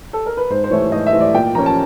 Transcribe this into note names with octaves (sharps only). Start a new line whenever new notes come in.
A4
A#4
B4
G#2 C5
C5
E3 A3 C#5
G#2 D#5
E5
E3 A3
D5
A#2 G5
F3 A#3 C#4 A#5
A5